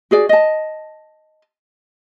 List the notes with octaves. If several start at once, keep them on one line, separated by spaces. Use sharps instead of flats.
F#4 G#4 D5
D#5 A5